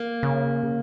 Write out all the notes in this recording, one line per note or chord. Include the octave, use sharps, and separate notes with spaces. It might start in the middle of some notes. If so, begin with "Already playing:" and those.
Already playing: A#3
C#3